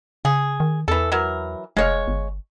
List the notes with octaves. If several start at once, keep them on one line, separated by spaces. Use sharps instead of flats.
C#3 G#4
D#3
E2 E3 A4
E3 F#3 A#4
F1 G#3 C#5 F5
G1